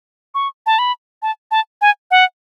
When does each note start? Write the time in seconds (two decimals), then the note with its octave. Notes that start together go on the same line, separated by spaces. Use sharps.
0.35 C#6
0.66 A5
0.79 B5
1.22 A5
1.51 A5
1.81 G#5
2.11 F#5